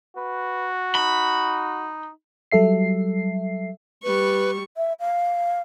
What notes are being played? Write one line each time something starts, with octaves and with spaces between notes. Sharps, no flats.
F#4 B4
D#4 B5
F#3 G3 A4 E5 C7
G3 B4 C#6
E5
F5